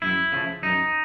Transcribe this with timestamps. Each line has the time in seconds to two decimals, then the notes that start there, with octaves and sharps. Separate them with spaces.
0.02 F#2 E4
0.32 C#3 F3 A3
0.62 F#2 D#4